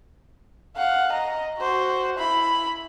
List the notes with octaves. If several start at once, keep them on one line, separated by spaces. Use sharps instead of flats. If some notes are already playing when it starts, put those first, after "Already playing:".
F5 F#5
D#5 A#5
F#4 C5
E4 B5